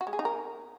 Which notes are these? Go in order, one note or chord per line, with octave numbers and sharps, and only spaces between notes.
F#4
G#3
G#4
D#4
A#4